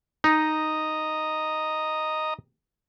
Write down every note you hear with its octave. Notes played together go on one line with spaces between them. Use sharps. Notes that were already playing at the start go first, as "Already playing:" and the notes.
D#4 D#5 A#5